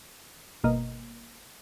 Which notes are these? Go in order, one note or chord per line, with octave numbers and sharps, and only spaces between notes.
G1 B2 A#3 D#5